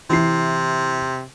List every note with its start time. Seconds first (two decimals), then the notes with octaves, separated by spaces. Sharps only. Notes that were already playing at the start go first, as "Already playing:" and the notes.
0.10 C3 E3 E4 C7